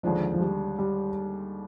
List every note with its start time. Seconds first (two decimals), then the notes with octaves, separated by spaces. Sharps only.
0.03 D#2 D3 F3 G#3 D4
0.33 F3
0.41 G3
0.79 G3